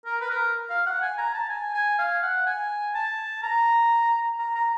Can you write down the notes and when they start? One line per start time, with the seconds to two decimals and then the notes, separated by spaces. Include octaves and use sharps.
0.06 A#4
0.21 B4
0.30 A#4
0.70 F5
0.86 F#5
1.02 G#5
1.18 A#5
1.34 A5
1.49 G#5
1.74 G#5
1.99 F5
2.22 F#5
2.46 G#5
2.95 A5
3.43 A#5
4.39 A#5
4.55 A#5